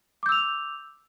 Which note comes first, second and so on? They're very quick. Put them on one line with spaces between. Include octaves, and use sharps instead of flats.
D6 G6 E6 F7